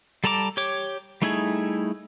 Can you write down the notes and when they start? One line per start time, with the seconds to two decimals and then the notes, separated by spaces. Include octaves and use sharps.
0.24 G3 A4 A5 A#5 D6
0.57 G4 C#5 D6
1.22 G3 A3 D#4 E4 G#4